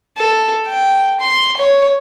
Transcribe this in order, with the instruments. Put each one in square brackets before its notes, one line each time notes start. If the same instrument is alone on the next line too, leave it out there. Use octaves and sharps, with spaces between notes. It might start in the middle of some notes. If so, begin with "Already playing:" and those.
[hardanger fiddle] A4
G5
C6
C#5